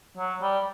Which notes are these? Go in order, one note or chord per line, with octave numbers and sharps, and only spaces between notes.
F#3
G3